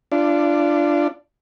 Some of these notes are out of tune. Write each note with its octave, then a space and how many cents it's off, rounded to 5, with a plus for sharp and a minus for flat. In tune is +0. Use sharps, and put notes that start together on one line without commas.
D4 +0 F4 -30